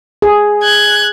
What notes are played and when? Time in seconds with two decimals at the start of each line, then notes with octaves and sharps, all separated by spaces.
0.22 G#4
0.63 F#6 G#6